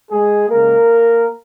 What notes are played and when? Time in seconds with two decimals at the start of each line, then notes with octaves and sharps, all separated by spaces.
0.11 G#3 G#4
0.49 C#3 G#3 A#3 A#4